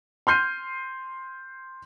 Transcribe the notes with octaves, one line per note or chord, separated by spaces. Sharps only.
C6 F6 G6 C7 D#7